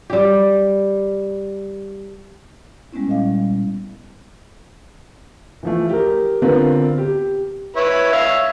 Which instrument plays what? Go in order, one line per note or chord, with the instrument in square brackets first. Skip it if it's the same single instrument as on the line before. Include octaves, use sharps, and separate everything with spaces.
[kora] G3 G4
[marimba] G3 G#3 B3 C#4 E4
A#2 D#5 F5
G3
[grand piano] E3 F3 A3
G4 A#4
D3 B3 C4 F4 A#4 B4
G4
[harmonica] E4 B4 C#5
C#5 E5 F5